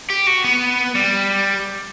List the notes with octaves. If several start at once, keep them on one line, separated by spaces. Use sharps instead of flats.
G4
F#4
B3
G3